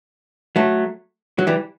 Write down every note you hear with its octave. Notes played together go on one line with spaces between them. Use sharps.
F#3 A3
F#3
E3 G3